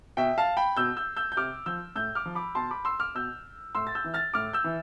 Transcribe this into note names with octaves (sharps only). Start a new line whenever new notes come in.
B2 E5 G5
F5 A5
G5 B5
B2 E6 G6
E6 G6
E6 G6
G6
C3 D6 F6
F3 E6 G6
A2 E6 G6
D6 F6
F3
B5 D6
B2 A5 C6
B5 D6
C6 E6
D6 F6
B2 E6 G6
A2 C6 E6
A6
E6 G6
E3
F6 A6
A2 D6 F6
E6 G6
E3